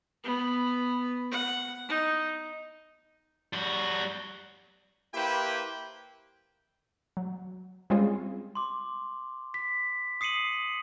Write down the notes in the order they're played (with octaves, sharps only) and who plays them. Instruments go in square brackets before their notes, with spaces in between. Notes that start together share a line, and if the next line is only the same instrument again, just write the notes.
[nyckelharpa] B3
F#5
D#4
[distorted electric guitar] G3 F#4
[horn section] A#3 E4 G4 B4 C5 G5
[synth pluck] F#3
G3 G#3 C4 C#4 F4 G#4
[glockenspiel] C6 D6
B6
D#6 C7 C#7 D#7 F#7